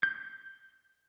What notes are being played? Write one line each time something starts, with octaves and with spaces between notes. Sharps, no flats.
G6